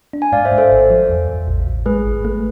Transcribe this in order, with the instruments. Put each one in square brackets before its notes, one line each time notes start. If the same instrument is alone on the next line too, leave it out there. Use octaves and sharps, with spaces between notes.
[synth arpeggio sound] D4
[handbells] G#5
[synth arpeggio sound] G#2 [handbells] D5 F5
[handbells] C5 E5
[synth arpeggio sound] G#2
[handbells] A4 C5
[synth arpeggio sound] G#1
F3
E2
E2
A1
A1
[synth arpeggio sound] G#3 [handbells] G#4 B4
[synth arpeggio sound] G#1
A3